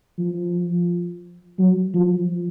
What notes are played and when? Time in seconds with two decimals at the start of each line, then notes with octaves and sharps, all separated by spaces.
0.19 F3
1.59 F#3
1.94 F3